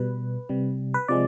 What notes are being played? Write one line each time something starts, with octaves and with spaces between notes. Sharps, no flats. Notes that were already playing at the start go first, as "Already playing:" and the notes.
Already playing: B2 G3 B4
C3 G3
B4
C3 F3 G#3 D5